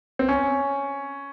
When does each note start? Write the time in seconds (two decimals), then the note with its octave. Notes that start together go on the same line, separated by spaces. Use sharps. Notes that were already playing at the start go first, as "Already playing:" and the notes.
0.19 C4
0.29 C#4